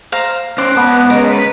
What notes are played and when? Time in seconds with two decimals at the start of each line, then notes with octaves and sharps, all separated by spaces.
0.12 C5 F5 A#5
0.58 C#4 C5 D5 C6 F#6
0.77 G#2 B3 A5
1.10 G#3 C#4 A#4 D#5
1.29 B4 B6